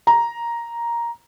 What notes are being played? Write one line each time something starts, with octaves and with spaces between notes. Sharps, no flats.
A#5